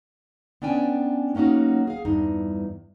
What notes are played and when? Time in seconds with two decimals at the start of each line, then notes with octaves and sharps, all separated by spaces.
0.62 B3 C#4 D4 G5 G#5
1.35 F#3 A#3 C#4 D#4 F#4
1.87 G#4 F5
2.05 E2 G2 D#4